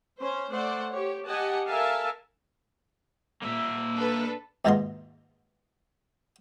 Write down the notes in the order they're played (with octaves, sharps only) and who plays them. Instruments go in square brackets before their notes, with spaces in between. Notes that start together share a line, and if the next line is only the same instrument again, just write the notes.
[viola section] C#4 C5
A3 C5 D5 F#5
G4 C#5
G4 D#5 F#5 G#5 A5
A4 A#4 E5 F5 G#5 A5
[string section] A#2 [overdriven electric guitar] A#3 E5
[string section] D4 A4 B4
[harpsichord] D#2 G#2 B2 F4 A#5 C6